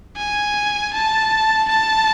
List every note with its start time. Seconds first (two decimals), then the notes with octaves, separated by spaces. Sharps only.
0.17 G#5
0.94 A5
1.69 A5